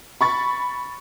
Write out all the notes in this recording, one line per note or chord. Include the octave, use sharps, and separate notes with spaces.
B5 C#6 A6